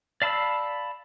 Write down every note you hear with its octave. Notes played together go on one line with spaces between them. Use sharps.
D5 F5 A5 B5 E6